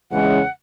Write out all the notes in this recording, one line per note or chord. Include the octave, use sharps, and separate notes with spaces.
E2 C#3 E3 G#3 C#4 F#5